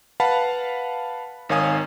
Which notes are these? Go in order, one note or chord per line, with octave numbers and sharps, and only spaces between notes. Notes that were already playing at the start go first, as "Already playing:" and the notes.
B4 F5 F#5 A5 B5
G#1 D#3 C#5 F5 G#5 D#6